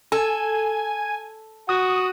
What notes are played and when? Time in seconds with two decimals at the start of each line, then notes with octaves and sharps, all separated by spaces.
0.12 A4 G#5
1.69 F#4 D#6